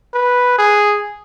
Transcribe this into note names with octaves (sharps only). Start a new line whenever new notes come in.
B4
G#4